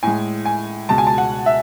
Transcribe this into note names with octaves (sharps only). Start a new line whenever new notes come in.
A2 G#3 G#5
G#5
C#2 B2 G#3 A5
G#5
A5
F#5
E5